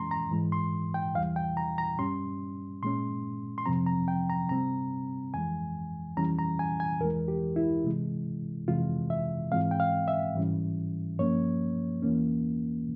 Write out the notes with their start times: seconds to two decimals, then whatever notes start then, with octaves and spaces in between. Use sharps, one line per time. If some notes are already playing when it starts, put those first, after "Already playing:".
Already playing: F2 E3 G#3 C#4 A#5 C6
0.11 A#5
0.31 G#2 E3 G#3
0.52 C6
0.94 G5
1.15 E2 E3 G3 F5
1.36 G5
1.57 A#5
1.78 A#5
1.99 G2 G3 C#4 C6
2.83 A#2 G#3 C#4 C6
3.58 C6
3.66 F2 C3 F3 C4 A#5
3.86 A#5
4.08 G5
4.30 A#5
4.49 C3 G3 C4 A#5
5.34 F2 E3 G#3 G#5
6.17 F2 E3 G3 C#4 A#5
6.39 A#5
6.59 G#5
6.80 G#5
7.00 E2 E3 G#3 A#4
7.28 G4
7.56 E4
7.85 C3 E3 G#3
8.68 F2 C3 E3 G#3 F4
9.10 E5
9.51 G#2 E3 G#3 C4 F5
9.71 G5
9.80 F5
10.08 E5
10.35 G#2 E3 G3 C#4
11.19 G2 F3 A#3 C#4 C#5
12.02 E2 E3 A#3 C#4